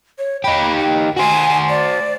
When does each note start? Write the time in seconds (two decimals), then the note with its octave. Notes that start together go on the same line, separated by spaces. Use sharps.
0.18 C#5
0.44 D#4 G4 B5
0.79 G5
1.17 F#4 C5 G#5
1.69 D5